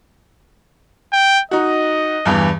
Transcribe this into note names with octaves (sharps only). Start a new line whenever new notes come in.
G5
D#4 F#4 D#5
E2 G2 E3